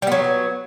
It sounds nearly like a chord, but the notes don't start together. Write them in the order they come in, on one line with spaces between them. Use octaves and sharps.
G3 B3 F#3